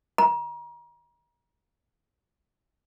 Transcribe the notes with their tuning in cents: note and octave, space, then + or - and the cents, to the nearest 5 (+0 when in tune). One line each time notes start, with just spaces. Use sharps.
A#5 +35